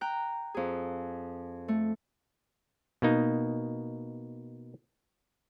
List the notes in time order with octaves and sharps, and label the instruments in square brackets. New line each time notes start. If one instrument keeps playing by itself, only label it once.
[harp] G5 A#5 F#6
F2 G#4
A3
[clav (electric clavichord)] B2 A#3 D#4